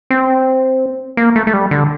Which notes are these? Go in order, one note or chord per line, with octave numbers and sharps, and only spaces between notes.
C4
A#3
A3
A3
G3
D3